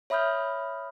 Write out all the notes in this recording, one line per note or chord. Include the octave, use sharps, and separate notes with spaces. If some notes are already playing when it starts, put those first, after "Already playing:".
C#5 E5 B5 D#6 F6 G6